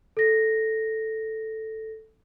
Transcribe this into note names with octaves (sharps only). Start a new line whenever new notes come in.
A4 A#6